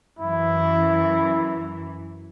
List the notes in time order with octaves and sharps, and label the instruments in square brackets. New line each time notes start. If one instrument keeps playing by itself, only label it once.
[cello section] F#2 E3 [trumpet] E4